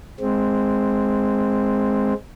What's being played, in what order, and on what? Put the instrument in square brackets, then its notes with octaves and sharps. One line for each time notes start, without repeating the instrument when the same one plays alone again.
[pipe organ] G#3 C4